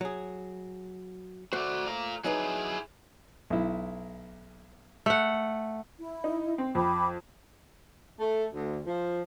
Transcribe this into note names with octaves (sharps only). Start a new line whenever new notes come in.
F#3 G#4
A3 F#4 C5 D5
F4 A#5
F#3 D#4 E4 G#4 B4
B1 E4
A3 F#5
E4
D#4
C4
F2 G5 B5 D6
A3
D2
F3